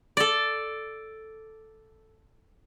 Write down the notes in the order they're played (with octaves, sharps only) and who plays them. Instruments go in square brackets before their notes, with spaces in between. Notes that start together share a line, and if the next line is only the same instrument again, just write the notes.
[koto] A4 D5